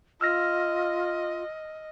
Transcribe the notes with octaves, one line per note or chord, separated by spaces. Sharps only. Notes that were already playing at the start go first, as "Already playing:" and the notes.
F4 D#5 E6 F6 A#6